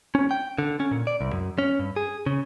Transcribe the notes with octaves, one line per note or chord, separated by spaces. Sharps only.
C#4
G5
D3
C#4
A#2
D5
C2
F#2
C#4
G2
G#4
C#3